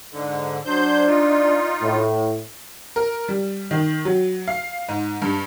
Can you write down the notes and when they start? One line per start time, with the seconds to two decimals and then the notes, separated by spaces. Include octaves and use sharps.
0.11 G#2 D3
0.66 F#3 D4 C5 G6
1.07 D#4 F4
1.81 A2
2.96 A#4
3.28 G3
3.71 D#3
4.05 F#3
4.48 F5
4.88 G#2
5.22 G2